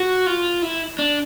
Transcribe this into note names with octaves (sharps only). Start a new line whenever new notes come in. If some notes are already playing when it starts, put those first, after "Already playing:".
Already playing: F#4
F4
E4
D4